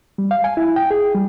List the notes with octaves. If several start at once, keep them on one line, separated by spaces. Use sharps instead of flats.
G3
F5
G#5
E4
G5
G#4
G3